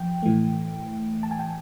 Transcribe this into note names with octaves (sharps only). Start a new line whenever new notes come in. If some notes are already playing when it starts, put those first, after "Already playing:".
Already playing: F3 G5
A2 E3 A3
A5
G#5
G5